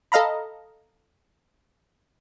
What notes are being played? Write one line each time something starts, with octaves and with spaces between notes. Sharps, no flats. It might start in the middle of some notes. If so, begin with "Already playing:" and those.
A4 D#5 F5 A#5 B5